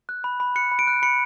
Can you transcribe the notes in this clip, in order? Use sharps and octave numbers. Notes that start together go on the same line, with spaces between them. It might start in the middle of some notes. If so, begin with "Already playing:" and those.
F#6
B5
B5
F#6 C#7
B5
D7
F#6
B5 C#7